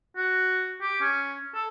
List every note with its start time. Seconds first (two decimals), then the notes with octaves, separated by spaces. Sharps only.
0.17 F#4
0.81 G4
1.01 C#4
1.54 A4